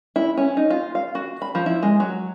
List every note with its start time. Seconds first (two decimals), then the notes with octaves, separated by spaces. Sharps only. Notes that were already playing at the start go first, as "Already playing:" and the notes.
0.16 E4
0.37 C#4
0.57 D#4
0.70 F4
0.95 F5
1.15 F#4
1.42 B5
1.55 F3
1.66 E4
1.83 G#3
2.00 F#3